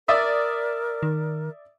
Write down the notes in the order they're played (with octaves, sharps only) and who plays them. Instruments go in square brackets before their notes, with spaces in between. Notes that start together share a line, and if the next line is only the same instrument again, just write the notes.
[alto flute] A#4 [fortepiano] D5 E5 D#6
[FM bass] D#3